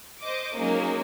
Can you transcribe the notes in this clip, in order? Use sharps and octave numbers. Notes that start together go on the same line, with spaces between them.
C5 D#5 D6
F#3 G#3 A#3 C#4 D#4